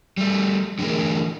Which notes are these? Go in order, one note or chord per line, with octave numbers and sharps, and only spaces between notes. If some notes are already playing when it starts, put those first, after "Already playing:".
G3 A3
D3 E3 A3 G#4 A#4